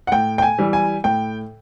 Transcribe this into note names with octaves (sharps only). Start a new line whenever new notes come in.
F#5
A2 G5
G5
G#5
E3 G3
G#5
A2 G5